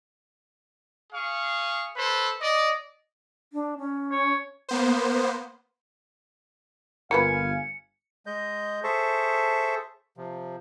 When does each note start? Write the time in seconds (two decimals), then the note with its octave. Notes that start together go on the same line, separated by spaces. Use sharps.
1.12 G#4 F5 C#6
1.96 A4 B4 C5
2.41 D5 D#5
3.53 D4
3.79 C#4
4.11 C#5
4.69 A#3 B3 C5
7.11 G1 A#3 F4 B4 F5 G#5 C#7
8.26 G#3 D#5 G6
8.84 G#4 A4 C5 E5 A5 C#6
10.17 C3 F3